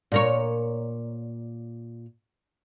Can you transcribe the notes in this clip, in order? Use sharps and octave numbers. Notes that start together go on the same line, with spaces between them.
A#2 A#4 C#5